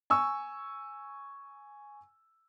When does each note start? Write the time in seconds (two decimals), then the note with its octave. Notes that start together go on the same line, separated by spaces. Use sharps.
0.10 G#5 C#6 E6